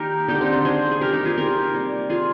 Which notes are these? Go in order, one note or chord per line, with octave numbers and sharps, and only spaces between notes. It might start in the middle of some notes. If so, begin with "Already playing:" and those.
Already playing: D#3 A#3 D#4 G4 A#4
D3 G#3 D#4 G4
C4 D#4
D4
G#4 C5
G#4
C3 G3 A#3 G4 A#4
D#4 G4
F4 G#4
G4 A#4
C3 G3 A#3
F4 G#4